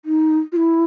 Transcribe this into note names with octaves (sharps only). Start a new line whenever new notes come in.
D#4
F4
E4